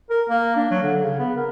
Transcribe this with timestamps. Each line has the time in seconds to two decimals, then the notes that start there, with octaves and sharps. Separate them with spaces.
0.10 A#4
0.29 A#3
0.56 D4
0.71 F#3
0.83 D3
1.03 C#3
1.19 B3
1.36 A#4